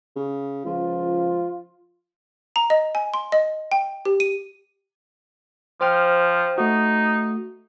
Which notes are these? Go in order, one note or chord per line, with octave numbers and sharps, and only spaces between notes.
C#3
C#2 F3 F4
A#5
D#5
G#5
C6
D#5
G5
G4
D#7
F3 C5 G5 F6
A3 D#4 F#4